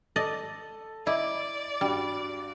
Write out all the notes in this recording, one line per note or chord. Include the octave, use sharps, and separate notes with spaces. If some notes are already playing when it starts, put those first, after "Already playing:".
A4 D5 D#5
E4 D5 D#5 D6
G2 G3 F#4